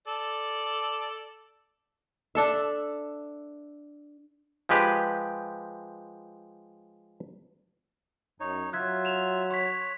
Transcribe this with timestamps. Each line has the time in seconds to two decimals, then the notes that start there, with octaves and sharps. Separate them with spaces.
0.08 A4 D5
2.35 D4 A4 E5
4.69 F3 G#3 G4 B4
8.40 F#2 D#4 C#5
8.73 F#3 F4 E5 F#6 G#6
9.05 E7 F7
9.50 C#5 C6 B6